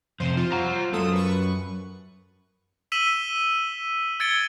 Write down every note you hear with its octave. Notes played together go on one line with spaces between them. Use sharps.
F2 C3 C5
F4 C5
F#5 A#5
B1 F#2 F4 A4 D#6
B4 C#6
E6 B6 D#7 E7 F#7 G7
E6 G#6 A6 C#7 D7 G7